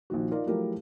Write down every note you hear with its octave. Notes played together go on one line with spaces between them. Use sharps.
A#1 D#3 F#4
D#4 F4 A#4 D5
F3 F#3 A3 E4 G4 A#4